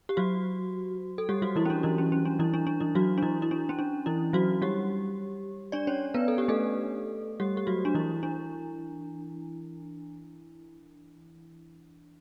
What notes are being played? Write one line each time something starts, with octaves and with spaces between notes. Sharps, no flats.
G4
F#3 F#4
A4
G3 G4
F#3 F#4
E3 E4
C#4
D4
E3 E4
C#4
C#4
D4
E3 E4
D4
D4
E3 E4
F#3 F#4
D4
E3 E4
E4
D4
C#4
D4
E3 E4
F#3 F#4
G3 G4
D4 D5
C#4 C#5
B3 B4
A4
G4
A3 A4
G3 G4
G4
F#3 F#4
D4
E3 E4
D4